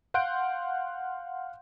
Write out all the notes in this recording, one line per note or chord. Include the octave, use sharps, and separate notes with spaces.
F5 F#5 C6 F#6 G6 D7